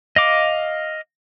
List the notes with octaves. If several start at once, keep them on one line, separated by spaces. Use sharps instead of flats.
D#5 F5 D6